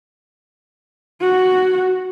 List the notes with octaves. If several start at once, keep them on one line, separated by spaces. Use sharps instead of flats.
F#4